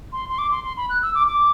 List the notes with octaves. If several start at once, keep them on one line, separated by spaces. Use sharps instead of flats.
C6
C6
D6
C6
C6
B5
F#6
E6
D6
D6